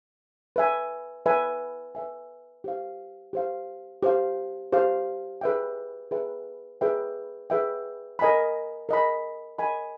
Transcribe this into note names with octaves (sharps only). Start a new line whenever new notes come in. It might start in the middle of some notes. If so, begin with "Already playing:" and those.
B4 E5 G#5
B4 E5 G#5
B4 E5 G#5
G4 C5 F5
G4 C5 F5
G4 C5 F5
G4 C5 F5
G#4 B4 E5 G5
G#4 B4 E5 G5
G#4 B4 E5 G5
G#4 B4 E5 G5
A#4 D#5 G#5 B5
A#4 D#5 G#5 B5
A#4 D#5 G#5 B5